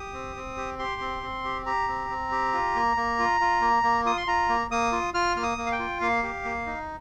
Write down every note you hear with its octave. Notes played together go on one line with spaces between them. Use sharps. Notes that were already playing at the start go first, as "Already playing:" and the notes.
Already playing: G4 D#6
C4
C4
G4
G4 C6
C4
C4
G4
G4 A#5
C4
C4
G4
F4
A#3
A#3
F4
F4
A#3
A#3
F4 D#6
C6
F4 A#5
A#3
A#3 D#6
F4
F4 F6
A#3 F6
D#6
A#3
F5
G5
F4
A#3 F5
G4
A#3
D#4